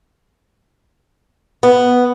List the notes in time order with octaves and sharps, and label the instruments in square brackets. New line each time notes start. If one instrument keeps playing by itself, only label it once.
[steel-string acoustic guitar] B3